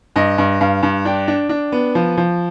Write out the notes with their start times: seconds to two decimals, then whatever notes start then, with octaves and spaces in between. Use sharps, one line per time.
0.16 G2 D#5
0.38 G2
0.61 G2 F5
0.83 G2
1.05 D4 G5
1.28 D4
1.49 D4
1.72 B3
1.95 F3
2.17 F3